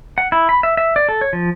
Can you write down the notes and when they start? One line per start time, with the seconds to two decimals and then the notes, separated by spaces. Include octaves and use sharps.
0.18 F#5
0.32 E4
0.49 B5
0.63 E5
0.77 E5
0.96 D5
1.09 A4
1.21 C#5
1.33 F3